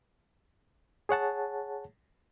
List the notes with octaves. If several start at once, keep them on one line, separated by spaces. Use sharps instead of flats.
G#4 C#5 F#5 A5